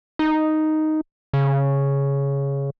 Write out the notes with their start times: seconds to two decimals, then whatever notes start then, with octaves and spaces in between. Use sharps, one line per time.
0.19 D#4
1.33 C#3